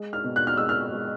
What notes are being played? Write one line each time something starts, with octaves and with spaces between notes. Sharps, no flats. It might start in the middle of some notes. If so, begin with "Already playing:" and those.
Already playing: G#3
F6
B2
F#6
F6
G#3 E6
F6
G#3